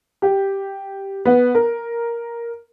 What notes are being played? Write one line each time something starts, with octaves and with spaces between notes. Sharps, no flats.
G4
B3
A#4